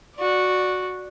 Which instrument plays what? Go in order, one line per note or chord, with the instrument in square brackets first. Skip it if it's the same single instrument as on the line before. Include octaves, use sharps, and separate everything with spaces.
[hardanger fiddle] F#4 D5